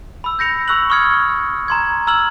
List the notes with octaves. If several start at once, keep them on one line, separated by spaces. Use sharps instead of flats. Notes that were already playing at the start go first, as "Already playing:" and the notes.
B5 E6
G6 A#6 C#7 F7
B5 C#6 E6 F#6 F#7
C#6 D#6 F6 G#6 C#7
A#5 C6 G#6
A#5 E6 F6 G#6 F#7